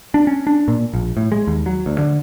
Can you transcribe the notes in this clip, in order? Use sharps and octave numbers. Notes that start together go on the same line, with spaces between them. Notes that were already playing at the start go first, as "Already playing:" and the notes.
D4
C#4
D4
A#2
A#1
A2
G#3
D#2
F#3
D2
D3